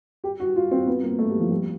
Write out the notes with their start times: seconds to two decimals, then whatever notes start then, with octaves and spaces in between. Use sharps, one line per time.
0.24 G4
0.40 F#4
0.56 F4
0.71 C4
0.87 B3
1.03 A#3
1.18 A3
1.29 G3
1.40 F3
1.50 G3